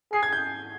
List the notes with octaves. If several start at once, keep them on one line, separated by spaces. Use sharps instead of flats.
G#4 C7
G#6
G6